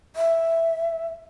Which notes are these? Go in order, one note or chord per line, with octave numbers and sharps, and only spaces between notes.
E5